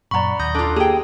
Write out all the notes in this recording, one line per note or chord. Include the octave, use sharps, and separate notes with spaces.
F#2 A#2 D5 F#5 A#5 B5 C#6
D#2 D#6 G6 A#6
D4 F4 A4
A#3 G4 G#4 G5